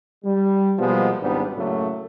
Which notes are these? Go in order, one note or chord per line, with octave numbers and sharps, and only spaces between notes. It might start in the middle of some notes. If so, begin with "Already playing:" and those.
G3
B2 F3 G3 G#3 A#3 B3
G#1 C#2 G#2 G3 B3 D4
F#2 A2 C#3 F#3 A3 A#3